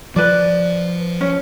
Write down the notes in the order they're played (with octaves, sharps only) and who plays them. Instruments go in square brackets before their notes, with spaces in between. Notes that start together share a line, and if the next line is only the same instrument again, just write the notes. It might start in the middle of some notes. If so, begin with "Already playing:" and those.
[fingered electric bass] F3 [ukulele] B4 D5
[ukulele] C#4